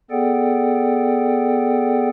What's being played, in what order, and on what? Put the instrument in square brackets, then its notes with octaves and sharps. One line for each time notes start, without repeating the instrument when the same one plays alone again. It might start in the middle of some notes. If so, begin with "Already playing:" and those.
[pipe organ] B3 G#4 A4 D5 F#5 G5